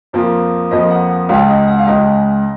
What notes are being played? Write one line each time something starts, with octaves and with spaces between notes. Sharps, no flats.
F2 F3 A#3
F2 F3 A#3 D#5
F#5
F#5
C#2 C#3 G#3 F5
D#5
F#5
F5
C#2 C#3 G#3 D#5